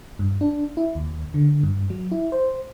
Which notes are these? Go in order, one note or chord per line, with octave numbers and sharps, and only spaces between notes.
G2
D4
E4
D#2
D3
G2
F#3
E4
C5